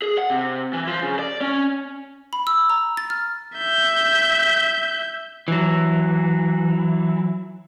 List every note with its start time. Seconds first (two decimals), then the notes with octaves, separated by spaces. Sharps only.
0.02 G#4
0.18 F#5
0.30 C3
0.73 E3
0.88 F3
1.02 C#3
1.19 D5
1.41 C#4
2.33 B5
2.47 E6
2.70 A#5
2.97 A6
3.10 F6
3.57 E5 G6
5.48 E3 F#3